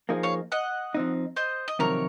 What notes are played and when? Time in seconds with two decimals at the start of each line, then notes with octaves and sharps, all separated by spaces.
0.09 F3 A#3 D#4 G#4
0.23 C#5 F5
0.52 D#5 F#5
0.94 F3 C4 D#4
1.36 C5 D#5
1.68 D#5
1.79 F2 C3 D#3 F#3 A#4 C#5